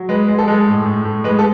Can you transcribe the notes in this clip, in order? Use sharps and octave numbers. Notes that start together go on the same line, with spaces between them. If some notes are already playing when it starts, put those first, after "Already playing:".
Already playing: F#3
G#3 B4
G#3
A4
G#3
A2
A2
A2
G#3 B4
A4